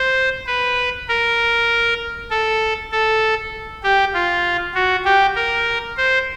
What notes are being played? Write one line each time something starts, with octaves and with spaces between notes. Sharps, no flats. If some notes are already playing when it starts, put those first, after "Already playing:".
Already playing: C5
B4
A#4
A4
A4
G4
F4
F#4
G4
A#4
C5